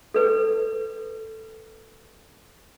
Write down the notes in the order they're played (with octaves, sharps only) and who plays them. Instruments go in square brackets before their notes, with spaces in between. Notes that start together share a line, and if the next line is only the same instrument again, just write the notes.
[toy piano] A4 B4